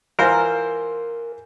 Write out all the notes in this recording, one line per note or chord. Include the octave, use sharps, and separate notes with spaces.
E3 F4 A#4 C5